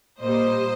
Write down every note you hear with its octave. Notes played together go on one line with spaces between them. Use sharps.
A#2 G3 A#3 C5 D#5